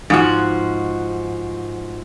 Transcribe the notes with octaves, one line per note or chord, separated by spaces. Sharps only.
G#2 F3 F#4